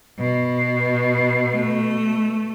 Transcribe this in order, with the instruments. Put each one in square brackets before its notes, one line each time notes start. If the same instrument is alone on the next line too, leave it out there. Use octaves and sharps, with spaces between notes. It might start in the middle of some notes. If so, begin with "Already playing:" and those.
[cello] B2
[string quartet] A3